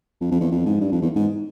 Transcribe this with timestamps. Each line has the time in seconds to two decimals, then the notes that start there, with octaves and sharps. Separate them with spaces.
0.21 F2
0.31 F2
0.41 E2
0.51 F2
0.66 G#2
0.81 G2
0.92 F2
1.02 E2
1.16 G#2